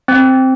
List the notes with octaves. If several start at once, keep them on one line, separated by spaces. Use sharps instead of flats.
C4